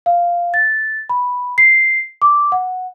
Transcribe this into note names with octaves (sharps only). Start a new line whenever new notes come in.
F5
A6
B5
C7
D6
F#5